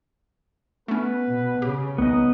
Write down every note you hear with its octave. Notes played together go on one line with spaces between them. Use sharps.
A3 B3 C#4 B4
B2
C#3 G4
C2 B3 D#4 D#5